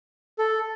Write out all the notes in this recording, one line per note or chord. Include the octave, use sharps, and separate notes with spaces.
A4